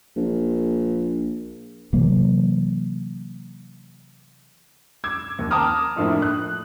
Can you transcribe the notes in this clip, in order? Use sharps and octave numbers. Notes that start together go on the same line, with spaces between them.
A#1
C3 E3 F#3 A#3
D6 E6 G#6
D#2
G5 A5 A#5 D6 D#6 F6
F2 A2 F3 A#3 D4 E4
F#6